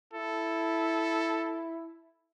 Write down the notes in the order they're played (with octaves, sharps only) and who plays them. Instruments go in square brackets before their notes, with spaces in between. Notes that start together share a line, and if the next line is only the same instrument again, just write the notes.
[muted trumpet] E4 [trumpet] A4